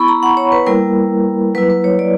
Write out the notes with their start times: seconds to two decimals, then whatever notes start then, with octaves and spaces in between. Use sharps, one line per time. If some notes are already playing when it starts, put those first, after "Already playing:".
Already playing: B3 E4 B5 C#6
0.08 A#5
0.23 F#5
0.37 C#5
0.52 B4
0.67 G3 A#3 E4 A#4
1.55 F#3 A#3 E4 B4
1.70 B4
1.84 C#5
1.99 D5